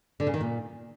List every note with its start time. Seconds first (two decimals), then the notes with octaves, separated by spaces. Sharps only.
0.20 D3
0.27 C#3
0.34 D#3
0.41 A#2